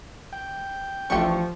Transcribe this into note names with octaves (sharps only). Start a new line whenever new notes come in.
G5
A1 F3 A3 D4 G4 C#6